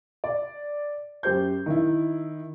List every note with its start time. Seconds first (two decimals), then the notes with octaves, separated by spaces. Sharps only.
0.24 D5
1.23 F#2 G4 C5 G6
1.66 D#3 E4